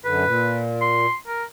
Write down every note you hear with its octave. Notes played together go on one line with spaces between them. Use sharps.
F#2 D3 B4
A#2
C6
A#4